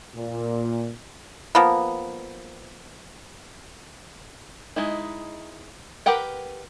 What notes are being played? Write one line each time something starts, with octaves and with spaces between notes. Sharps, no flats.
A#2
F3 A#3 B3
G#3 D#4 E4
G4 A#4 B4 F#5 G5